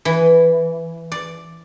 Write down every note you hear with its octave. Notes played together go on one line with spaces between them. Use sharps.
E3
D5